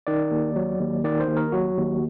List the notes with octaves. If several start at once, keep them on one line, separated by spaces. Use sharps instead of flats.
D#3 D5
D#2
F#3
D#2
D#3 D5
C5
D#2
A#4
F#3 F#4
D#2